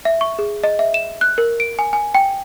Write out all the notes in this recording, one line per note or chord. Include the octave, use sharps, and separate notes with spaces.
E5
C#6
G#4
D#5
E5
E7
F#6
A#4
D7
G#5
G#5
G5